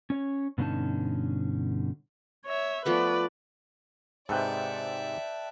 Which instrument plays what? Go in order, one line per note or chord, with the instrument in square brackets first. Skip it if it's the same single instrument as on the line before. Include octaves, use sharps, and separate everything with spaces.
[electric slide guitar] C#4 C#5
G2 B2 D3 C#4 D#4 A5
[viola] C#5 E5
[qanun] F3 A3 B3 [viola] B4 D5
[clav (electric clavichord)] G#2 C3 [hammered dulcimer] A4 B4 G5 [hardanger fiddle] D5 E5